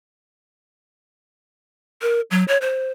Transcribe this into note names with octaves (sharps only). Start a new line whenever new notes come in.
A#4
F#3
C#5
C5